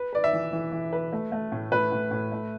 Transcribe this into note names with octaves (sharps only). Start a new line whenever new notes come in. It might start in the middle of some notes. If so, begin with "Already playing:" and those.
Already playing: B4
B4 D5
E5
E3
E3
E3
B4
A3
A3
A2
A2 B4
A2
A2
A3